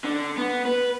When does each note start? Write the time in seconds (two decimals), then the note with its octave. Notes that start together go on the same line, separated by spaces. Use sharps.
0.04 D3
0.37 B3
0.65 B4